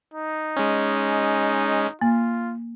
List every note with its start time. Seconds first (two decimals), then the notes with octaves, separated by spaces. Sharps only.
0.14 D#4
0.57 G#3 C#4
2.01 A#3 F4